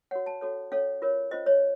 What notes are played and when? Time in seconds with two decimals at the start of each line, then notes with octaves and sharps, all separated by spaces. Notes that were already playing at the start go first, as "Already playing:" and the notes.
0.11 F#4 A#4 C#5 F#5
0.26 A5
0.41 C#4 F#4 A4 C#5
0.72 C#4 A4 C#5 F5
1.02 F4 A#4 C#5
1.31 C#4 F4 C5 D#5
1.46 C#5